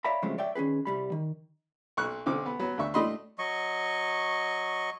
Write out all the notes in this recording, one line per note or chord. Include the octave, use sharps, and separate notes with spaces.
C#5 D5 E5 F5 A#5 B5
C#3 F3 F#3 G#3 A3 C4
C#5 D5 E5 G5
D#3 C#4 D4 G#4 B4
C2 G3 B5
D#3
B1 C#6 F#6
B1 D3 C4 D6
B3
F#3 B3
D2 D4 E5 C#6
A2 A3 D4 D#5 B5 C6
F#3 D#5 C#6